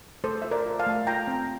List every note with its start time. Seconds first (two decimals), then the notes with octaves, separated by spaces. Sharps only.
0.24 A3 A4 C5
0.42 F4 E5
0.51 A#4 D5
0.66 F4
0.80 F5 A5
0.87 A3
1.07 F4 G5 A#5
1.27 C4